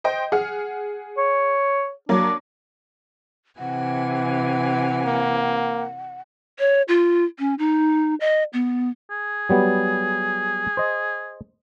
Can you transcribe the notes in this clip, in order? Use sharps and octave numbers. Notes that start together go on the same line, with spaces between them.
C5 D#5 G5
G#4 F#5 F6
C#5
F#3 A#3 D4
C3 E3 F#5 G#5
A#3
C#5
F4
C#4
D#4
D#5
B3
G#4
F#3 G3 B3
C5 D#5